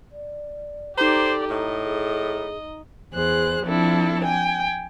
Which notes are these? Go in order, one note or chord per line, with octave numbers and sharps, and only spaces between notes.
D5
D#4 G4 A4 C5 D5 A#5
A2 D#5
G#4
E2 G#4 C5 F#6
F3 C4 D4 E4 A4
G5 G#5